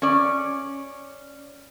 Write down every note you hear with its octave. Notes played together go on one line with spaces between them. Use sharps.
C#4 D5